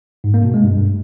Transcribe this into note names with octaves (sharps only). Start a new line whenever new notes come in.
G#2
A#3
B2
G#3
G2